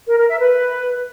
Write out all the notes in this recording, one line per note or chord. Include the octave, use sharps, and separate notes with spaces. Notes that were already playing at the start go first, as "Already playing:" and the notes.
A#4
A#4
E5
B4